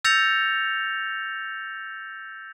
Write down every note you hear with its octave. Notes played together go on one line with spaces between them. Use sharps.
E6 G6 A6 A#6 C#7 F7